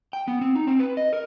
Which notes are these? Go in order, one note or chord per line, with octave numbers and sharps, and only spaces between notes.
G5
B3
C4
D#4
C4
B4
D#5
A#4